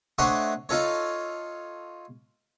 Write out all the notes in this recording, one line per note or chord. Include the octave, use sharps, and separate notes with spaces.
A3 D4 C5 C#5 D#5 F#5
D#4 F4 A4 C#5